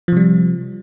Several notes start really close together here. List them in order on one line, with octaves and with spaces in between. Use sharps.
F3 C3 G3